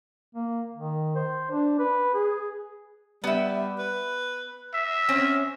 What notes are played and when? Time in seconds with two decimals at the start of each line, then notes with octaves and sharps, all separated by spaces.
0.35 A#3
0.75 D#3
1.15 C5
1.51 D4
1.79 B4
2.14 G#4
3.24 G3 B3 E5
3.79 B4
4.74 E5
5.09 C4 C#4